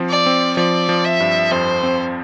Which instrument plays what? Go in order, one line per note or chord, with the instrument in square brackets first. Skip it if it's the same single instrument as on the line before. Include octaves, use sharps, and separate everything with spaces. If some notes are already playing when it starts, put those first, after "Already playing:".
Already playing: [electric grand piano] F3 C4
[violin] D5
[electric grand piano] C4
[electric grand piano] F3 [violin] D5
[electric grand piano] F3
[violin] E5
[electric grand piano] G2
[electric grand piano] F2 [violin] C5
[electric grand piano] C4